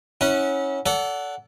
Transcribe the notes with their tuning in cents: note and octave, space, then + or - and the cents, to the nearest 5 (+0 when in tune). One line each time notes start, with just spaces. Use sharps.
C#4 -10 E4 -35 F#5 +0
A4 +0 D5 -35 F#5 +0